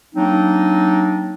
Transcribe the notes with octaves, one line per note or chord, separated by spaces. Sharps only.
F#3 A#3 C4 D4 D#4